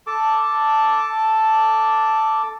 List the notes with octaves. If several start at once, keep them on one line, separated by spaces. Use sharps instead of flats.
A4 A5 D6